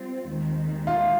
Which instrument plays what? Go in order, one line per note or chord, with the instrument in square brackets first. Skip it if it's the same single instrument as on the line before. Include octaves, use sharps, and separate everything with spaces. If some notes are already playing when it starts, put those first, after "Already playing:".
Already playing: [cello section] G3 C4 F4
D#2 D#3 G#3
[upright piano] F4